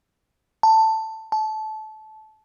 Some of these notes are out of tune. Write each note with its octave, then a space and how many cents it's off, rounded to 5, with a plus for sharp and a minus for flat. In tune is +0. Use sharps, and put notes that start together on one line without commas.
A5 +10
A5 -20